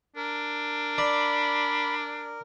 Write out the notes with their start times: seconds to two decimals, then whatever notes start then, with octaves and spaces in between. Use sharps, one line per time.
0.16 D4 A#4
0.98 D5 B5